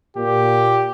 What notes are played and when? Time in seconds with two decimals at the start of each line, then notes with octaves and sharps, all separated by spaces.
0.17 A#2 G4